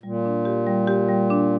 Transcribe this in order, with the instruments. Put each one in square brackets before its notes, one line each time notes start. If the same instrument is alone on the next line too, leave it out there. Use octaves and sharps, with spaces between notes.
[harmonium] A#2 [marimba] G3
[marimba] D4
G4
G3
G4
G3
D4